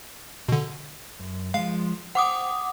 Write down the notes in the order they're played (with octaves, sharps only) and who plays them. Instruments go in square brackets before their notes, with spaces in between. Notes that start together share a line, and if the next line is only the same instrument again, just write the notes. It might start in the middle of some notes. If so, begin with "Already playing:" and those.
[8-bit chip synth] B2 D3
[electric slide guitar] F#2
[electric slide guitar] F3 G#3 [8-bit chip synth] F5
[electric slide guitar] C5 G5 [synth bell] F#5 D6 D#6